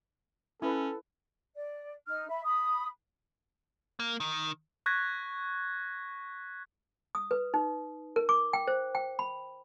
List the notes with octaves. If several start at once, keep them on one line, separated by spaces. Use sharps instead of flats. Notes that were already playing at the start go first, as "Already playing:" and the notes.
C#4 E4 A4 B4
D5
D#4 F6
E5 B5
B5 D#6
A#3
D#3
C#6 F#6 G#6 A#6 B6
D#6
B4
D#4
A#4
D6
G5
C5
G5
B5